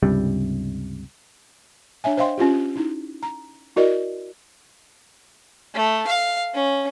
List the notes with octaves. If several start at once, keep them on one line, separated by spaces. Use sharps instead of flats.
C#2 G2 C3 G3
D4 C#5 E5 G#5
C5 D#5 F5 G5 C6
C#4 F4 G4
D#4 E4
A#5
E4 F#4 A#4 D5 D#5
A3
F5
C#4